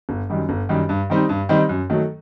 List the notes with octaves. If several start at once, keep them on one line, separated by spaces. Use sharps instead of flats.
G1
F#2 D#3 G3
G1
F#2 D#3 G3
G2
D#3 G3 C4 D#4
G2
D#3 G3 C4 D#4
F#2
D#3 F#3 A3